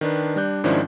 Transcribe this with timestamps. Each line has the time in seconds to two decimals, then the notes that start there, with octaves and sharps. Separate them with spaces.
0.01 D#3 D4 B4
0.36 G3 D4 F#6 G6
0.64 G#2 D#3 F3 C#4 D4 E4